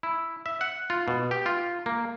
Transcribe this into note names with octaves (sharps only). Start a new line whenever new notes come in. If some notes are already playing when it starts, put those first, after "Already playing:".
E4
E5
F#5
F4
B2
G4
F4
A#3